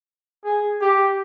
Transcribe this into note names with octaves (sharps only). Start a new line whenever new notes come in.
G#4
G4